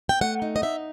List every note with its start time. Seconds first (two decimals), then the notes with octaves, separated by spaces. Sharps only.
0.09 G5
0.21 A3 F#5
0.42 D#4
0.56 D#5
0.62 D#4 E5